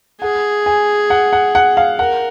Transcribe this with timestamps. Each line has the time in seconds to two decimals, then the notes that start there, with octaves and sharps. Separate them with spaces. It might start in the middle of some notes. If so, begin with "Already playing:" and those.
0.21 G#4 F#5
0.66 G#5
1.10 F#5
1.33 F#5
1.55 F#5
1.77 F5
1.99 A#4 F#5